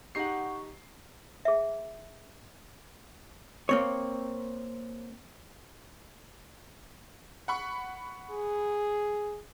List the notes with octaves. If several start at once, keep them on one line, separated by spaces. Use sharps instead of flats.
D#4 G4 F#5 C#6 C7
G#4 E5
A#3 C4 C#5
F#5 B5 C#6
G#4